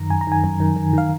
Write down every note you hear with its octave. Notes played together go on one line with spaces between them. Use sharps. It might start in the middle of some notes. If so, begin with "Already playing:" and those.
Already playing: F#2 D#3 A#5
F#2 G#5
A#5
D#3 G#5
F#2
D#3
D#3
D#3 F5